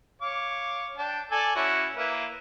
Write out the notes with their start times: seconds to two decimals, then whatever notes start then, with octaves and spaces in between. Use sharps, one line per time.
0.22 C#5 F5 D6
0.98 D4 G5
1.32 A4 D5 G#5
1.56 C#4 E4 F#4
1.95 A#3 E4 B4